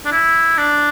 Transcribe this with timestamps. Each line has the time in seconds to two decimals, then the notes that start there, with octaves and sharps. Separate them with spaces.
0.05 D4
0.12 E4
0.58 D4